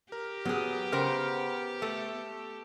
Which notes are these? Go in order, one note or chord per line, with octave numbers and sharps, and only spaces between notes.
G4 A#4
F#3 B3 G#4
C#3 A#4 C5 F#5 G5 F6
A3 A4